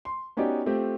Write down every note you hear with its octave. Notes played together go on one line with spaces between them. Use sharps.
C6
B3 C#4 D#4 F#4 G4 D5
A3 C4 F4 G4